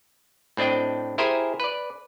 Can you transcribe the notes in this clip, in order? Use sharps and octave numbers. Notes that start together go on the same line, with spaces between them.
A2 C4 D4 D#5 G5
E4 G4 G#4 A#4 C5 G#5
B4 D5